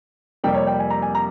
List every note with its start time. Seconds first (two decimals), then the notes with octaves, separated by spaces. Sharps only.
0.44 F2 C3 G3 A#3 G5
0.55 C#5
0.67 G5
0.79 G#5
0.90 A#5
1.02 G#5
1.15 A#5